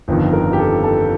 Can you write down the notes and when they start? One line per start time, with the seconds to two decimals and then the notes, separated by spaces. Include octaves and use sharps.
0.08 G1 F2 D#3
0.33 A#4
0.53 G4
0.59 A4
0.84 A4